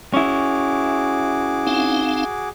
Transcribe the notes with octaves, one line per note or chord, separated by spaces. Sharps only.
C#4 E4 F#4 G#4 D6
C4 D#4 F5